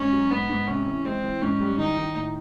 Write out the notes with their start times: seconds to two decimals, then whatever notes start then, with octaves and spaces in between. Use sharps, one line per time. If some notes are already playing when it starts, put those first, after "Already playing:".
Already playing: G#2 C#4
0.13 F#3
0.30 G#2 B3
0.49 G#2
0.67 C3 C#4
0.86 E3
1.05 G#3 C4
1.23 E3
1.42 G#2 C#4
1.60 G3
1.78 D#3 D#4
1.97 D#3
2.15 A2